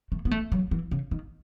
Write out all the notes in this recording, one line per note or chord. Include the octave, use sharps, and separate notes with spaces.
A3
B3
A3
F#3
E3
C#3
D#3